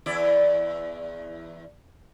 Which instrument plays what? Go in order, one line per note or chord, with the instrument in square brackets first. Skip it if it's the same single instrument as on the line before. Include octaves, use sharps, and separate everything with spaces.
[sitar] E2 E4 D5